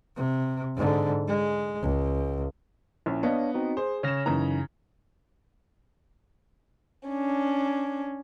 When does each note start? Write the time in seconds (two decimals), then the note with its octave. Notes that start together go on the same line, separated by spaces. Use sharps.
0.17 C3
0.76 G#2 D3
1.28 G#3
1.82 C#2
3.06 A#1 C#4 E4
3.23 B3 D4 C#5 D#5 F5
3.54 C4 D#4 F#4
3.77 G#4 C5
4.03 C#3 C#5 F6 A#6 E7
4.26 F#2 C#3 E3 D#4 A#5
7.08 C#4 D4